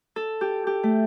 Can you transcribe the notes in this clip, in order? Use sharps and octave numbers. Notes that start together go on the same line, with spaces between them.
A4
G4
G4
A3